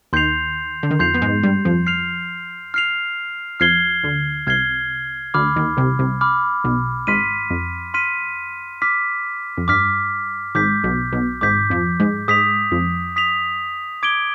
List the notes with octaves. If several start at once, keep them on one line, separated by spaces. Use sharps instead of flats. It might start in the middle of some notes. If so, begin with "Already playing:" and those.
D#2 D#3 C6 G6 C7 F7
D3
D#3
F2 F3 C6 G6 C7 F7
B3
G#2 G#3
G2 G3
F2 F3
F6 C7 F7
F6 C7 F7
F2 F3 F6 G#6 C7 G7
D2 D3
C2 C3 F6 G#6 C7 G7
D2 D3 B5 D6 F6
D#2 D#3
C2 C3
C2 C3
B5 D6 F6
B1 B2
G#1 G#2 C6 F6 B6 D#7
F2
C6 F6 B6 D#7
D6 F6 B6
F2
G2 D6 F6 B6
G#1 G#2 D6 G6 B6
B1 B2
B1 B2
G#1 G#2 D6 G6 B6
F2 F3
G#2 G#3
G#2 G#3 D#6 B6 F7
F2 F3
D#6 B6 F7
D6 G#6 D7 G7